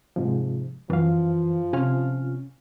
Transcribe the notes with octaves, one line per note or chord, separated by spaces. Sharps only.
G#2 C3 F3
F#2 E3 F3 F5
C3 C#4 F4 F6